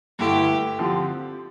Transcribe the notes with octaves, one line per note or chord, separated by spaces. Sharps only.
G2 D3 A3 E4 G4
D3 F3 C4 G4